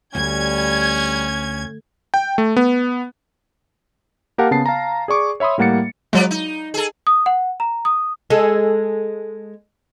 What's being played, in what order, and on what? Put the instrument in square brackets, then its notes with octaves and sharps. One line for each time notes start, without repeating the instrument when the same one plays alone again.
[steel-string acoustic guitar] D2 [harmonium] G3 [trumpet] C#4 [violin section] G#6
[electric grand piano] G5
A3
B3
A#3 G4 A#4 F5 F#5 A5
C#3 B3 A5 C7
F5 A5 A#5
G#4 D5 C#6 D6
C#5 E5 B5 C6 D#6
A2 G3 A#3 F#5 A6 C#7
[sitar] F3 B3 D5 [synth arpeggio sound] F#3 G#3
[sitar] D#4
G#4 A4
[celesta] D#6
F#5
A#5
D#6
[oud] G#3 A4